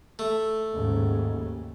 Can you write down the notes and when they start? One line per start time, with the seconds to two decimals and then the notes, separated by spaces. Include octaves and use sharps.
0.19 A3
0.73 D#2 G#2 C#3